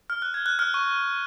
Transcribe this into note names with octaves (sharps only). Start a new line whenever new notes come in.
F6
F#6
G#6
F#6
F6
C#6